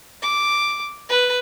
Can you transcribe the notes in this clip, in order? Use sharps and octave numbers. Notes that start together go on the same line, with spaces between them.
D6
B4